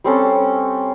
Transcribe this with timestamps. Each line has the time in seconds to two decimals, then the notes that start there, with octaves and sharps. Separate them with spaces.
0.04 G3 C4 C#4 A4